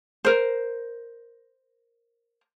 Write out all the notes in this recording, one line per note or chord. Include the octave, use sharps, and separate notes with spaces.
A#4 C5